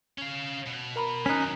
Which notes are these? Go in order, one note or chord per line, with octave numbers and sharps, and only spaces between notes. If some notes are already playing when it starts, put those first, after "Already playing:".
C#4 F5
B2
A#4 A#5 B5
D#3 F#3 C#4 D#4 F#6 B6